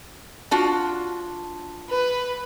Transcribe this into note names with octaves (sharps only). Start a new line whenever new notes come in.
D4 F4 F#4
B4